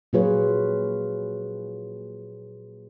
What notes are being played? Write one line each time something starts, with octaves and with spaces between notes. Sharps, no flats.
A#2 F#3 F4 G#4 B4 C#5